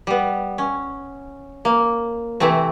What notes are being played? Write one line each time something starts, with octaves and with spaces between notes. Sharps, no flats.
G3 B3
C#4
A#3
C3 E3 A3 C4